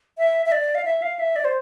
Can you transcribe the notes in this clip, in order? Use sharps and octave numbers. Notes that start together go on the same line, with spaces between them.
E5
E5
D5
F5
E5
F5
E5
D5
C5